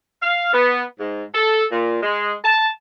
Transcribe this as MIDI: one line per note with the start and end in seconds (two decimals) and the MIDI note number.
0.21 0.49 77
0.53 0.82 59
1.00 1.23 44
1.33 1.65 69
1.72 1.98 46
2.02 2.33 56
2.44 2.67 81